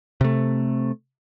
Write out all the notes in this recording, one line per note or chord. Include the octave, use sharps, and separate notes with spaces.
C3 A3